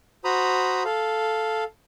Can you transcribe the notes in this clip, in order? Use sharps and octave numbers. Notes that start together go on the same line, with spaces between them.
F#4 C5 A#5 B5 D#6
A4 F5